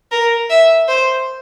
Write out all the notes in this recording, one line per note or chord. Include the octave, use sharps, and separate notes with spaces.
A#4
E5
C5